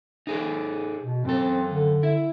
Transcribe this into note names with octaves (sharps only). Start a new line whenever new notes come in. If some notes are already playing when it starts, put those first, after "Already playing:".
D#4 G#4 A4
B2
F#2 C4 A4
D3
E4